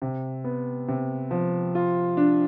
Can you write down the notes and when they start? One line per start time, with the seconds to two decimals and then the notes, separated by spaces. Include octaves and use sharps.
0.02 C3
0.44 B3
0.88 C3
1.31 F3
1.75 F4
2.17 D4